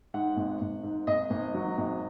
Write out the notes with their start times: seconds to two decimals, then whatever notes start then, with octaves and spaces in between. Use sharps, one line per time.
0.14 G#2 F#5
0.36 G#1
0.61 G#1
0.83 G#2
1.07 G#1 D#5
1.30 G#1
1.54 F#3
1.78 G#1